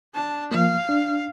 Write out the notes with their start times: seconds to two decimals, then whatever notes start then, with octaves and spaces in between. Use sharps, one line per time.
0.14 D4 A5
0.51 F3 A#3 F5
0.89 D4